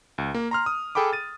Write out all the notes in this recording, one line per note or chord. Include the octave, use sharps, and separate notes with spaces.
C#2
A#3
A#5 C6 F6
D#6
G#4 A4 G5 B5 D6
A6 D#7